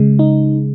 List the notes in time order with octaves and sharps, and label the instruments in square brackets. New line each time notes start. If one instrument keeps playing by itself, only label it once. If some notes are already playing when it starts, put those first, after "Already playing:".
Already playing: [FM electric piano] C#3 G#3
D#4